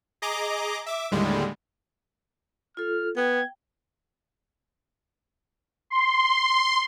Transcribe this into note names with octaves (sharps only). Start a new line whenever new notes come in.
G#4 D#5 A#5 D6
E5 D6
D#2 A2 D3 G3 G#3
F4 A4 F6
B3 G5 G#6
C6